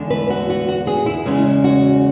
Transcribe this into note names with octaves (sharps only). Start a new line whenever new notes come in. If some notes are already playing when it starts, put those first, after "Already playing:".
Already playing: E2 D3 G#3 D4
B4
F#4
F#4
F#4
G#4
E4
E2 C#3 G#3 C#4
F#4